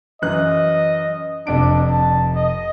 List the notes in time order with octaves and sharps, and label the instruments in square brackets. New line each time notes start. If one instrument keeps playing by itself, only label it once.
[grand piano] F#2 E3 F#6 [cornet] D#5
[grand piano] F1 F2 D7 [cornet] D4
[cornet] A5
D#5